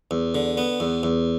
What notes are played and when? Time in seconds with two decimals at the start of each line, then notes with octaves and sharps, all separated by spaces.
0.11 E2
0.35 D3
0.57 B3
0.80 E2
1.03 E2